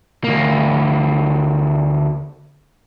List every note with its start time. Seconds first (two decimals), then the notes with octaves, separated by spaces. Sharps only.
0.24 D2 A#3